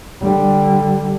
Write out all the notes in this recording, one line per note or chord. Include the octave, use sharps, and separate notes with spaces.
D3 G3